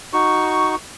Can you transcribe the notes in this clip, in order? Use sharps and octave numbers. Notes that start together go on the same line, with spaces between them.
D#4 F#4 C#6